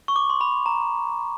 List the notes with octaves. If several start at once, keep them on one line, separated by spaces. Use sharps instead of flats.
C#6
D6
C6
B5
A#5